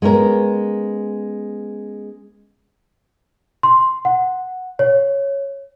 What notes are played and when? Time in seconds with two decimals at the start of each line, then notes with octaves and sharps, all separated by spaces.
0.02 G#3 B3 C#4 A#4
3.63 C6
4.05 F#5
4.79 C#5